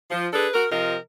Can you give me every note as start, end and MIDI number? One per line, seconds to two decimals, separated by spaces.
0.11 0.27 53
0.33 0.48 62
0.33 0.48 68
0.33 0.48 69
0.33 0.48 71
0.54 0.65 66
0.54 0.65 70
0.71 0.96 48
0.71 0.96 53
0.71 0.96 65
0.71 0.96 70
0.71 0.96 75